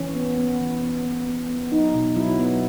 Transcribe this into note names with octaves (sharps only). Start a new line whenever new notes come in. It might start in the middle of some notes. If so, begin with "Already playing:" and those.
Already playing: E3 C#4
B3
B3
E3
B3
B3
B3
B3
F#3 D#4
B2
F#3 E4
B3